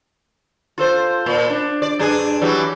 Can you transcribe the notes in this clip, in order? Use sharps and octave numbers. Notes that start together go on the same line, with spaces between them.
F4 A4 C5
A#2
D4
D5
G2 D4 G#4
E3 F#3 G3